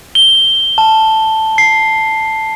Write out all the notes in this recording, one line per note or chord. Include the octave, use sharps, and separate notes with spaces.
G7
A5
C7